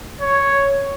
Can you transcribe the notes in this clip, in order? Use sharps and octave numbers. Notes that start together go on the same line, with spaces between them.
C#5